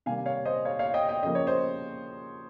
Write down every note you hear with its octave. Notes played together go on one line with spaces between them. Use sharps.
C3 D#3 G3 A#3 F5 G#5
C#5 F5
C5 D#5
C#5 F5
C#5 F5
D#5 G5
D#5 G5
C#3 F3 A#3 D#5
C#5
C5 D#5